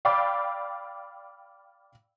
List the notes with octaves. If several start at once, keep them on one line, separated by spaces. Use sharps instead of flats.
D5 F5 G5 B5 D6 E6